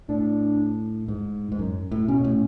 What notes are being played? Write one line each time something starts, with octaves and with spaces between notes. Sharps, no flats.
A2 D4
G#2
G#2
F#2
A2
B2 C#4
A2